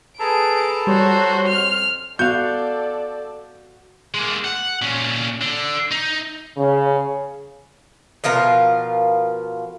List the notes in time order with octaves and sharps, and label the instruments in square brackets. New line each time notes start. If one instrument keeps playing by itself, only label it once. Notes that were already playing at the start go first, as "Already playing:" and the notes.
[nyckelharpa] G#4 B4 [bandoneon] A4 A5 A#5 [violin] D7
[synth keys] G3 C#5 [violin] F#4 [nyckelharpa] C5
[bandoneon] F2 [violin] F6
[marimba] B3 [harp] F#4 F5 [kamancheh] A4 D5 [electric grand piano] G6
[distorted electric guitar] G#3 A#3
F#5
A#2 C#4
D3
D#4
[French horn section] C#3
[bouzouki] B2 F3 F4 A#4